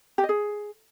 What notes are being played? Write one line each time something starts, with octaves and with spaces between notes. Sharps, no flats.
G4
D#5
G#4